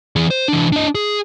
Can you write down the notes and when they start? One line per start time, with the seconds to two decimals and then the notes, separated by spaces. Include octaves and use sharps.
0.16 E3 G#4
0.30 C5
0.48 E3 D4
0.72 D4 D#5
0.95 G#4